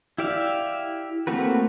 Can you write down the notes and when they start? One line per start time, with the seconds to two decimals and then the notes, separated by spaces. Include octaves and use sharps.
0.18 E4 G4 D5 E5 F5
1.27 A3 A#3 C4 F#4 B4